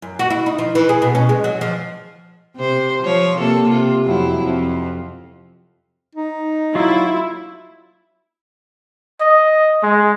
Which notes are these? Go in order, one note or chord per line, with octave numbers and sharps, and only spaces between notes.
F#2
F#4
E4
D#4
F3
E3
G#4
B2
C#4
G#3
F#3
F3
C3 C5
F3 C#5
C3 A#3 A4
C3 F4
F2 F#3 E4
F2
D#4
F#3 E4 F4
D#5
G#3